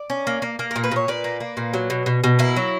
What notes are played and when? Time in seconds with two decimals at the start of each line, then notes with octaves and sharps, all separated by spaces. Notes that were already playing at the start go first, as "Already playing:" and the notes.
Already playing: D5
0.10 C#4
0.27 A#3
0.42 A#3
0.59 A#3
0.71 A#2 A#4
0.84 B4
0.91 A#2 C#5
1.08 A#2 B4 D5
1.24 A#3
1.40 A#3
1.57 A#2
1.74 F#3
1.90 B2
2.06 B2
2.24 B2
2.39 A#3 E4
2.56 F#3